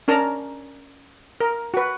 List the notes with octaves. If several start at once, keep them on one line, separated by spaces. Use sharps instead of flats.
C#4 D4 A#4 A5 A#5
A#4
F#4 B4